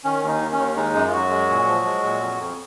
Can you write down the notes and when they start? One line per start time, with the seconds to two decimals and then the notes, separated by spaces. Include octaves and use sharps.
0.04 D#3 C#4
0.23 D#2
0.28 D#4
0.41 D#3
0.52 C#4
0.58 D#2
0.76 G#3 D#4
0.94 F#2
1.07 F4
1.13 F#2 F#3 F#4
1.30 G#3
1.49 A#2
1.67 F3
1.85 G#3
2.03 A#2
2.21 F2
2.40 F2